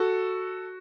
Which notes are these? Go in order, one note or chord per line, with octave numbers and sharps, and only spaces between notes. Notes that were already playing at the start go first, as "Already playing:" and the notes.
Already playing: F#4 A4